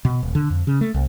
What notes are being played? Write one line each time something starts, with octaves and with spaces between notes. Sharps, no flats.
B2
D#1
D3
F2
C#3
A3
C2